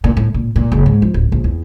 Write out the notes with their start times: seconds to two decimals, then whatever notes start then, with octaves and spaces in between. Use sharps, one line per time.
0.04 A#2
0.17 A2
0.34 A#2
0.56 A#2
0.72 F#1
0.86 G#2
1.02 F3
1.14 D1
1.32 A#1
1.44 E2